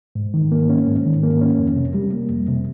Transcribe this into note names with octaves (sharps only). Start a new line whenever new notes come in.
G#2
D#3
A#3
C#4
G#2
D#3
A#3
C#4
F2
C3
G3
A#3
F2
C3